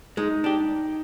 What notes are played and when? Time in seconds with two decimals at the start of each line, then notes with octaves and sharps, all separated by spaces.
0.17 G#3 D#4
0.44 D4 G4